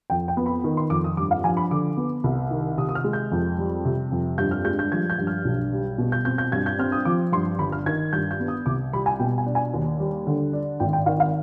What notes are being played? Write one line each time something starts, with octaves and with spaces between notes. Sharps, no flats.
F2 G5
G5
B3
B5
D#3
C6
F2 D6
D#6
G2 D6
F5
F3 G#5
B5
D3 D6
B3
C2
D#3
C3 D#6
D#6
F6
G#3
G6
F2
G3
C3
F2
G2 G6
F6
G#3 G6
G6
F3 G#6
G6
G2
F6
B1
G3
B2
G6
C4 G6
G6
G2 G#6
G6
C4 F6
D#6
F3 D6
G2 C6
G1 B5
F6
D#3 G#6
G2 G6
G6
B3
D#6
C2 D6
G3 B5
G#5
B2 G5
G#5
D4
G#5
D#2
G3
D3
D4
G#1 G5
G5
D#3 F5
F5